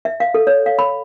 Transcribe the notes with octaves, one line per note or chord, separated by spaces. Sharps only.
E5
F5
A4
C#5
F5
B5